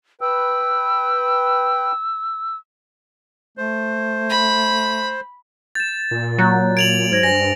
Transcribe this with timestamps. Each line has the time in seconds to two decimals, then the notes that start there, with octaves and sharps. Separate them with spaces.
0.21 B4 G5 E6
3.57 A3 C5
4.29 B5
5.75 G6 A6 E7
6.11 A#2
6.38 F#3 A#5 F#6 G6
6.77 G#6 D7 F7 F#7
7.12 G#2 C5 G#6 A#6
7.23 G2 C5 G#5 A#6